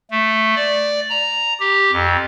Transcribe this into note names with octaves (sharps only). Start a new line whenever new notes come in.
A3
D5
A#5
G4
F2